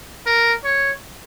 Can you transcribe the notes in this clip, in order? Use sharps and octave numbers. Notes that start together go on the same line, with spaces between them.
A#4
C#5